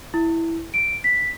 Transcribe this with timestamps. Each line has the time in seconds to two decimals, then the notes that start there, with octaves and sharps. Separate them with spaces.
0.14 E4
0.74 D7
1.04 B6